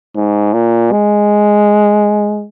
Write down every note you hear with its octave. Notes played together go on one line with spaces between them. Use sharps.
G#2
A#2
G#3